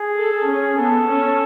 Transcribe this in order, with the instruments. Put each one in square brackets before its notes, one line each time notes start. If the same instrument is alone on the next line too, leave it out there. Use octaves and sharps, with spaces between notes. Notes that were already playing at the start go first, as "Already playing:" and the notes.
Already playing: [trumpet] G#4
[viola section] A4
C#4
[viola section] B3 [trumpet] A4
[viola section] C#4